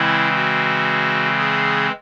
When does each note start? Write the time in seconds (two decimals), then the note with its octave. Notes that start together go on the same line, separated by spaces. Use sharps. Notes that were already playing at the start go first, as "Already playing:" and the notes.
Already playing: C#3 E3 G#3 C4 E4
0.35 F#4
1.39 G#4